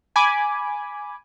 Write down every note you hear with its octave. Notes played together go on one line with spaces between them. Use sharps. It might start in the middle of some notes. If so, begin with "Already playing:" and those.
G#5 B5 D6